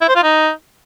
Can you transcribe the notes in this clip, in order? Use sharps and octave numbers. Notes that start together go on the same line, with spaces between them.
E4
C5
F4
D#4